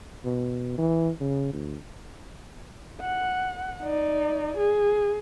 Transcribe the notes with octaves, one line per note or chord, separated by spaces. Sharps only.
B2
E3
C#3
D2
F#5
D#4 D5
G#4